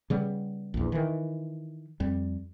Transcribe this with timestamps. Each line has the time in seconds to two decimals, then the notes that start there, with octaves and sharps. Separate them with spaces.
0.10 C#3 G3 B3
0.74 A#1 E2
0.92 D#3 E3
2.00 F2 G3